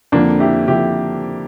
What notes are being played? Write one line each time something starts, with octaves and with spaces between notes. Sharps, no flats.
F2 D3 F3 A#3 D4
E4 G4
F2 D3 F3 E4 G4